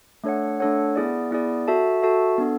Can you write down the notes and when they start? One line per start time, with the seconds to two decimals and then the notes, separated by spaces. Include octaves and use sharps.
0.24 A3 D4 A4 C#5 F#5
0.60 A3 D4 A4 C#5 F#5
0.96 B3 E4 G#4 D5
1.31 B3 E4 G#4 D5
1.68 F#4 A4 E5 A5
2.03 F#4 A4 E5 A5
2.38 B3 D4 A4